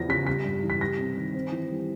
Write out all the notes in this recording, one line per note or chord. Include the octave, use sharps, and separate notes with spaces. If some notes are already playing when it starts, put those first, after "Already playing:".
Already playing: E2 F3 A#6
C#3 B6
G3 B6
G2
E3
B6
G3 A#6
C3
D#3
C4
E3
G3